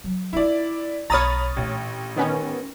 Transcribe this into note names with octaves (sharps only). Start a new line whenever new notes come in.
F#3
D4 E4 F4 D5
B1 C#5 A#5 B5 D#6 F6 A6
A1 A#2 D4
D#3 B3 C#4